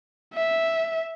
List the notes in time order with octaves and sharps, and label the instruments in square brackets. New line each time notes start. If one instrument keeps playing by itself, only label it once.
[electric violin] E5